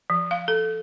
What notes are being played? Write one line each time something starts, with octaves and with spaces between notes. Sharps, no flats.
F3
F5
A4